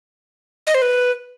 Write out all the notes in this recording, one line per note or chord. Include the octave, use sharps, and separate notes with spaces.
D#5
C5
B4